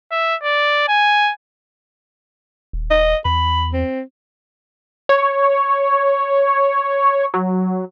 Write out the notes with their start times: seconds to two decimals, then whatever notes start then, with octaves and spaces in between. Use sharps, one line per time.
0.11 E5
0.43 D5
0.88 G#5
2.73 D#1
2.91 D#5
3.25 E2 B5
3.73 C4
5.09 C#5
7.34 F#3